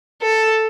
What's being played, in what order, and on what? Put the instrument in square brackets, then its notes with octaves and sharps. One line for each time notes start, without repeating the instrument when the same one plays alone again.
[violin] A4